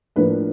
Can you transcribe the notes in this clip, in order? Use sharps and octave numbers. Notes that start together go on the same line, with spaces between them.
A2 F3 A#3 D4 B4